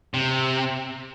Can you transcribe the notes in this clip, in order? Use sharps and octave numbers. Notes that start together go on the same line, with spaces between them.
C3